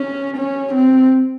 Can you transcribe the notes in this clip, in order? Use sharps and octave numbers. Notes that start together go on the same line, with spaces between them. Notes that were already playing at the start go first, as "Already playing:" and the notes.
Already playing: C#4
C#4
C4